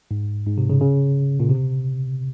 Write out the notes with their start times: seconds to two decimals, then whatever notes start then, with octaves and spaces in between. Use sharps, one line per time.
0.11 G#2
0.46 G#2
0.58 C3
0.70 C#3
0.81 C#3
1.40 A#2
1.49 C3